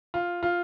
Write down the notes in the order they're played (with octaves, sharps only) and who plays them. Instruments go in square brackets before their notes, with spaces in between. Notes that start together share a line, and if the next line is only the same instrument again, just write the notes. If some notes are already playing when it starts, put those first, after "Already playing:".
[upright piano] F4
F4